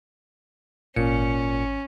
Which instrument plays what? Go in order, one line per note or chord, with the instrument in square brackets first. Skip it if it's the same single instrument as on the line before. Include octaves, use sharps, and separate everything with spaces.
[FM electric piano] G#1 C#7 [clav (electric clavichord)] A#2 [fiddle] C#4